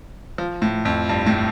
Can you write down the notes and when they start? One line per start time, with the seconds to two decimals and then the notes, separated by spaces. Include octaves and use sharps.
0.38 F3
0.62 A2
0.85 F2
1.09 G2
1.26 A2